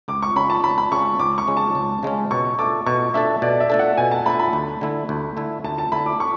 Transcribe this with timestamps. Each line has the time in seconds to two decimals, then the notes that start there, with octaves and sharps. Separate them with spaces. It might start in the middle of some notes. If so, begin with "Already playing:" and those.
0.08 C#2 D6
0.22 C#6
0.36 C#3 G#3 C#4 B5
0.50 A5
0.64 C#2 B5
0.78 B5
0.92 C#3 G#3 C#4 C#6
1.19 C#2 D6
1.38 C#6
1.48 C#3 G#3 C#4
1.57 A5
1.75 C#2
2.03 C#3 G#3 C#4
2.31 B2 C#6
2.59 A3 D4 A4 D6
2.86 B2 C#6
3.14 A3 D4 A4 E5
3.42 B2 D5
3.60 E5
3.70 A3 D4 A4
3.79 F#5
3.97 B2 G#5
4.11 A5
4.26 A3 D4 A4 B5
4.39 B5
4.53 D2
4.81 D3 A3 E4
5.09 D2
5.37 D3 A3 E4
5.64 D2 A5
5.78 A5
5.92 D3 A3 E4 B5
6.06 D6
6.20 C#6